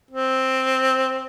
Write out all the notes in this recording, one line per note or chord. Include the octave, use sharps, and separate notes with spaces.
C4